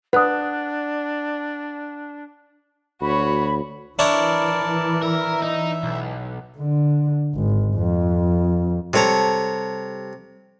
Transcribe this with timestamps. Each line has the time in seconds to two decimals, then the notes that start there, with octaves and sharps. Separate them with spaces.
0.13 D4 B4 F#5 D#6 F#6
3.01 D2 F#4 C#5 B5
3.99 E3 D4 E4 A#4 C#5 D5 A5
5.02 A#4 E5
5.42 D#4
5.83 B1
6.58 D3
7.35 G#1
7.75 F2
8.93 C3 G3 A4 C#5 A#5